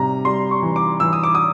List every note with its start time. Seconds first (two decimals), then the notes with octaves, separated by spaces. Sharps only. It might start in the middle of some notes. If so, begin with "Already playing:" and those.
Already playing: C3 G3 A#5
0.25 G3 C6
0.51 C#6
0.63 E3
0.76 D6
1.00 E3 E6
1.13 D#6
1.23 D6
1.35 D#6